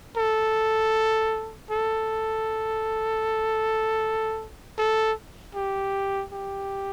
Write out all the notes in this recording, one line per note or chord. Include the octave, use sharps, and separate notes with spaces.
A4
A4
A4
G4
G4